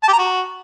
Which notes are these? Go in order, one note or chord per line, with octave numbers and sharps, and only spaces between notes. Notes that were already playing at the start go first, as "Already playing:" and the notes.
A5
G4
A#5
F#4